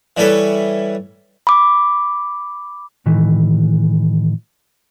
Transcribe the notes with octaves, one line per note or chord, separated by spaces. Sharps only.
E3 G3 E4 A4 B4 C#5
B5 D6
A2 D#3 E3